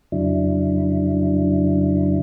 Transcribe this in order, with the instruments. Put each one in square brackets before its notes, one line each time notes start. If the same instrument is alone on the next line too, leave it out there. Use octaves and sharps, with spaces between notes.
[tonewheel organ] F2 C#3 F#3 D4 E4